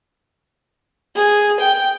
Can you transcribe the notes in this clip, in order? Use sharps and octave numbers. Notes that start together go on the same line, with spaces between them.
G#4
G5